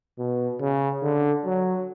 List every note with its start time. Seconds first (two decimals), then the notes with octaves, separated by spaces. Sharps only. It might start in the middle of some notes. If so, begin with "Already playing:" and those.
0.19 B2
0.61 C#3
1.03 D3
1.45 F#3